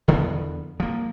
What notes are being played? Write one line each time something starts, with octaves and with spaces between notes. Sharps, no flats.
E2 D3 F3 B3
F3 A#3